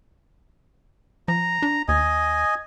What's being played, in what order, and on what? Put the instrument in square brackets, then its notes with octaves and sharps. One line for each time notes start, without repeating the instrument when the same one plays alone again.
[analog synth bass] F3 [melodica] A#5
[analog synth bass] D4
[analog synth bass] D#2 [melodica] D#5 G#5